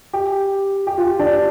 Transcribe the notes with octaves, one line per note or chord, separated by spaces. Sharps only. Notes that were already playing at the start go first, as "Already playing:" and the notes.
G4
G4
F4
D4